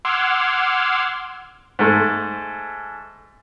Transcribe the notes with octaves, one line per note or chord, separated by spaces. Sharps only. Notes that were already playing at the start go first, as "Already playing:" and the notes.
F#5 C6 D6 E6 F6 G#6
G#2 A3